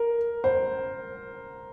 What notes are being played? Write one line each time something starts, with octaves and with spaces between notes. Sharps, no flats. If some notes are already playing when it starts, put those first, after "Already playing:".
Already playing: A#4
C5